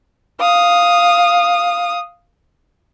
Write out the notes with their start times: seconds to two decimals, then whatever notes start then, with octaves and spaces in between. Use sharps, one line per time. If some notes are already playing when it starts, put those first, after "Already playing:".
0.40 F5 D#6